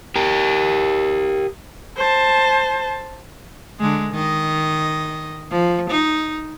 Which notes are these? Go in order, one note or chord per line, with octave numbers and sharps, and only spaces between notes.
G4 A#4
C5 A5
D3 G#3
D#3 D#5
F3
D#4